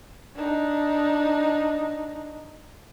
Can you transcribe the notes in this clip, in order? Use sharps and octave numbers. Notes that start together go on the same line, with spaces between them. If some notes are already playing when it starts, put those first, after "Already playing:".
D4 D#4